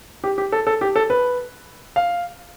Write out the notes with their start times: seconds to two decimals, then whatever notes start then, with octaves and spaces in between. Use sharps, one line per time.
0.24 G4
0.38 G4
0.52 A4
0.67 A4
0.81 G4
0.96 A4
1.10 B4
1.96 F5